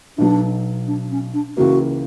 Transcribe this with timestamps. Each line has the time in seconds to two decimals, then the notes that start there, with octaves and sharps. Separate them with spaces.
0.18 B1 B2 F#3 D4
0.87 D4
1.11 C#4
1.34 D4
1.57 C#2 C#3 E3 A#3 F#4